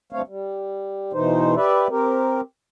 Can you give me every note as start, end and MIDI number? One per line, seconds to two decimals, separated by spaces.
0.13 0.22 43
0.13 0.22 50
0.13 0.22 57
0.13 0.22 60
0.13 0.22 73
0.13 0.22 77
0.28 1.12 55
1.13 1.55 40
1.13 1.55 47
1.13 1.55 52
1.13 1.55 63
1.13 1.55 72
1.56 1.87 67
1.56 1.87 71
1.56 1.87 74
1.56 1.87 76
1.90 2.41 60
1.90 2.41 67
1.90 2.41 70